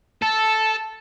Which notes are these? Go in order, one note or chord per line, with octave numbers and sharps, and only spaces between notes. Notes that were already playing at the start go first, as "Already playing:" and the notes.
A4 A5